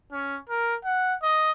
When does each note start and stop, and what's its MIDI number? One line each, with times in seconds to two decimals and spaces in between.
0.12 0.36 61
0.49 0.75 70
0.84 1.14 78
1.23 1.51 75